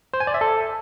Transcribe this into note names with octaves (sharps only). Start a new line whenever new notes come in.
C5
G#5
D5
E5
A4